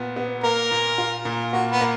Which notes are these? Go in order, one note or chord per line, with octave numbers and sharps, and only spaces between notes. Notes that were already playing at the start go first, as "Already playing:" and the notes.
Already playing: A#2 B3
B3
A#3 A#4
A#2
F4
A#2
A#3 F#4
B3
A#3